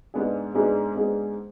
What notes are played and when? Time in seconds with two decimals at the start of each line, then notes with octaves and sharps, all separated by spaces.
0.14 G#2 G#3 B3 D4 G#4
0.55 G#2 G#3 B3 D4 G#4
0.95 G#2 G#3 B3 D4 G#4